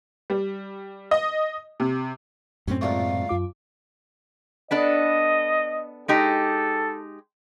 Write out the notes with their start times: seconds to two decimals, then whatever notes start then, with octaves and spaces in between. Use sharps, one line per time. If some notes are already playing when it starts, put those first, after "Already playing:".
0.30 G3
1.11 D#5
1.80 C3
2.67 F#2 A2 C4 C#4
2.81 C#2 A#2 A3 F5
3.29 F#2 F4 D6
4.71 B3 D4 A4 D#5
6.08 G#3 D#4 G4 A4